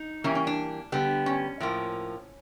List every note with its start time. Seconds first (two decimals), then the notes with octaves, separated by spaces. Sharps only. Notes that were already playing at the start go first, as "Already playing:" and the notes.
Already playing: D#4
0.24 E3 G3 A#3 C#4
0.35 C#4
0.47 D4
0.92 D3 G3 B3
1.26 C#4
1.60 A2 F3 A#3